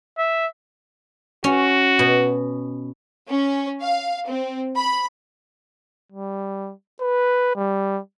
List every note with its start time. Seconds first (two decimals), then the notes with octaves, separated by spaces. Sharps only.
0.18 E5
1.44 C#4 F#4
1.99 B2
3.28 C#4
3.80 F5
4.26 C4
4.76 B5
6.12 G3
7.01 B4
7.56 G3